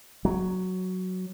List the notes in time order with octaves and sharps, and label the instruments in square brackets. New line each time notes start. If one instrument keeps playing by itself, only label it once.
[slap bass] F#3